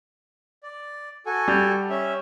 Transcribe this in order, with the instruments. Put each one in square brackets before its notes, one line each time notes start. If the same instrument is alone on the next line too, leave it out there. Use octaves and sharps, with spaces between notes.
[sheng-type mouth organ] D5
F#4 A4 G#5
[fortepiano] G3
[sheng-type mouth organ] C#4 E5